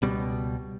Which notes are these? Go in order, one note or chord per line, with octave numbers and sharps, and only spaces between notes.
C#2 B2 G3